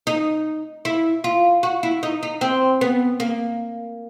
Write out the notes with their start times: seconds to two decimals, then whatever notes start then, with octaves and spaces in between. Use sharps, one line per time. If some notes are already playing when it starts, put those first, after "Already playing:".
0.07 D#4
0.85 E4
1.24 F4
1.63 F#4
1.83 E4
2.03 D#4
2.23 D#4
2.41 C4
2.81 B3
3.20 A#3